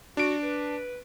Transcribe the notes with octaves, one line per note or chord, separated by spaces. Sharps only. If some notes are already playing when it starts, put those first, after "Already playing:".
D4 F#4 D7
B4